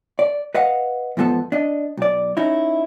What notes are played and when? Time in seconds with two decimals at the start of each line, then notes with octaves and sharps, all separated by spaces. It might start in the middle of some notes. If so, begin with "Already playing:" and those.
0.19 D5
0.55 B4 D#5 F5 F#5
1.17 E2 G#2 F3 B3 A4
1.52 D4 D#5
1.97 B1 D5
2.37 C#4 D#4 E4